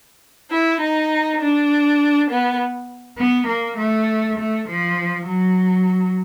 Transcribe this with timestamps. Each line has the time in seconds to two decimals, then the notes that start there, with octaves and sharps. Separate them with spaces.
0.48 E4
0.79 D#4
1.39 D4
2.28 B3
3.18 B3
3.48 A#3
3.78 A3
4.39 A3
4.69 F3
5.28 F#3